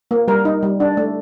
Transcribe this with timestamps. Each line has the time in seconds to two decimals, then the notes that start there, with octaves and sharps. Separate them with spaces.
0.11 A#3
0.28 G3 A#4
0.45 D#4
0.63 G3
0.80 D4
0.97 A3